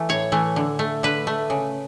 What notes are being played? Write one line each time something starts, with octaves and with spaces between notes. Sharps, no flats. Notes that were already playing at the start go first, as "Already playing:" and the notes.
Already playing: E3 A3
A2 C#5
E3 A3
D3
A3
D3 B4
A3
C#3